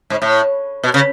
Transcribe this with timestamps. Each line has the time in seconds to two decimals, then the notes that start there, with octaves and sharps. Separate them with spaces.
0.10 G#2
0.22 A2
0.83 B2
0.94 C#3